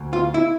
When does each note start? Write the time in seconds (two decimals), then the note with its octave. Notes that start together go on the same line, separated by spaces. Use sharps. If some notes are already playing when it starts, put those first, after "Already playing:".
Already playing: D2
0.13 F4
0.34 E4